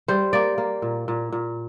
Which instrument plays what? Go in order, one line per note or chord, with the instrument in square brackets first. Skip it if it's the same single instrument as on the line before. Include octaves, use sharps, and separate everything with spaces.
[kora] G3 C5
A#3 D5
A#3
A#2
A#2
A#2